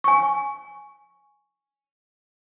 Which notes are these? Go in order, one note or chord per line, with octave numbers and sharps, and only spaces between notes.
G#5 C#6